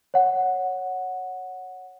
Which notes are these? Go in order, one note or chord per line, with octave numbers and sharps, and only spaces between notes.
C#5 F#5